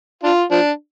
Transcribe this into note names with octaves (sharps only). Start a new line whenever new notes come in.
D4 F4
F3 D4